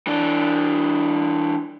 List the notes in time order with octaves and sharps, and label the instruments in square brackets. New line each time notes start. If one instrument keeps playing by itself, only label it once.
[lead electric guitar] E3 D4